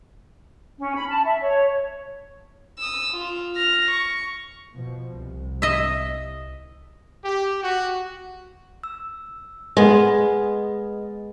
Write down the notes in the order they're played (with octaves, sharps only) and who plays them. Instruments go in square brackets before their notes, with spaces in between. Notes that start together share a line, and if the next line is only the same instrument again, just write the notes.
[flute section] C#4
B5
A5
E5
C#5
[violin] D#6 E6
F4
F6 A#6
C#6
[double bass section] B2 F3
C2
[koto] D#5 E5
[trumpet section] G4
F#4
[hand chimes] E6
[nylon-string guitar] G#3 B3 [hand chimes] B4 D#5